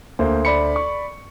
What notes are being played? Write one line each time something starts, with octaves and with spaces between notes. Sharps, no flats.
D2 A#3 C5
D5 B5 C#7
C#6